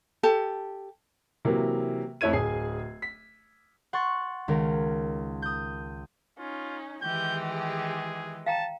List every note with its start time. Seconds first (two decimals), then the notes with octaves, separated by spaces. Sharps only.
0.23 G4 A4 A5
1.45 C3 E3 F#3 A#3
2.21 F2 A3 E4 C#5 G#6 D#7
2.33 D1 G#4 C7
3.02 B6
3.93 F#5 C6 C#6 A6
4.48 C#2 D#3 C#4 A#4
5.42 D#6 G6
6.39 C#4 D#4 F4
7.02 D#3 E3 G#3 G4 G6
7.56 G#4
8.46 F5 G5 A5 A#5